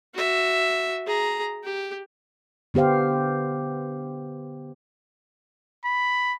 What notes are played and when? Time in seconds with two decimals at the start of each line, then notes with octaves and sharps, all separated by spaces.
0.14 F#4 E5
1.06 G#4 A#5
1.64 G4
2.74 D3 B3 G4 C5 F5
5.85 B5